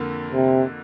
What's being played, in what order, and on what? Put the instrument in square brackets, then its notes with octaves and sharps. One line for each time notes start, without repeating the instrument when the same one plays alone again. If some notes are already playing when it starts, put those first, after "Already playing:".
Already playing: [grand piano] F2 D3 A#3
[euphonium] C3